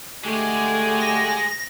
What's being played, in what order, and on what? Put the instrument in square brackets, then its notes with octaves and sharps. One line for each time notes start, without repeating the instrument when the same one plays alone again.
[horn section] D3 G4 G#5 [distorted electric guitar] G#3 [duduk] A3
[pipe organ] A#6